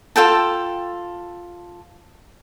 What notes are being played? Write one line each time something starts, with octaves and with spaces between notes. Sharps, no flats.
F4 A4 G5 A5